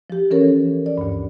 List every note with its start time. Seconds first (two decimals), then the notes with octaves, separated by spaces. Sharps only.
0.10 F3 G4
0.31 E3 C#4 A4 A#4 C#5
0.86 D5
0.98 D2 G2